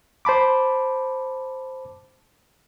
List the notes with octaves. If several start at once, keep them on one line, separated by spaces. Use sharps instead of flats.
C5 A5 B5 D6